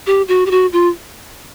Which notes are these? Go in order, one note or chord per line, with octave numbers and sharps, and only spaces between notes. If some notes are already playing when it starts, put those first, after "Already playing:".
G4
F#4
G4
F#4
F4